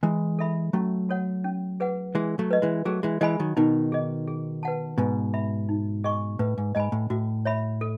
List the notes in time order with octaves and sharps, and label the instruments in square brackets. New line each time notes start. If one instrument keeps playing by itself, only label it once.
[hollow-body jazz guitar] E3 G#3 [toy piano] E4
[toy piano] A4 E5 B5
[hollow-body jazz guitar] F#3 A3 [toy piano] C#4
[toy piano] F#4 A4 C#5 F#5
C#4
G#4 B4 F#5
[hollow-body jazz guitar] E3 G#3 [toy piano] G#4
[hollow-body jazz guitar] F#3 A3
[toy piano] B4 D#5
[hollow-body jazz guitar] E3 G#3
[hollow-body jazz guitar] F#3 A3 [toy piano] G#4
[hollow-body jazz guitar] E3 G#3
[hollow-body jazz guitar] E3 G#3 [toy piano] D#5 G#5 B5
[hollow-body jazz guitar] D#3 F#3
[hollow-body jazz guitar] B2 D#3 [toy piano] D#4
[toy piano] G#4 D#5
G#4
B4 F#5 A5
[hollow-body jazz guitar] G#2 B2 [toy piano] B4
[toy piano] E5 B5
D#4
G#4 D#5 G#5 C#6
[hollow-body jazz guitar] A2 [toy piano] B4
[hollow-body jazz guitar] G#2
[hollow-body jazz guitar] G#2 [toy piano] D#5 G#5 B5
[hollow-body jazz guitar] A2
[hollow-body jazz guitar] A2 [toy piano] F#4
[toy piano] C#5 E5 B5
A4